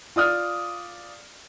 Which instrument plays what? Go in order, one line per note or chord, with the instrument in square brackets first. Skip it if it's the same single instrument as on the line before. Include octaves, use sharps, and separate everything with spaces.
[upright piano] F4 D5 D#6 F6